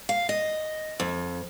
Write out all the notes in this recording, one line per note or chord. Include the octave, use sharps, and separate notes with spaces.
F5
D#5
F2